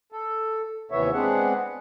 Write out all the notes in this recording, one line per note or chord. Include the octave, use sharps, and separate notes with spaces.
A4
D#2 C3 E3 B3 C#5 E5
G#3 B3 C4 D4 G#4 F#5